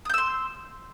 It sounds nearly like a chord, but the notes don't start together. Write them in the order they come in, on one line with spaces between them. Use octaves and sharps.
D#6 G6 E6 C6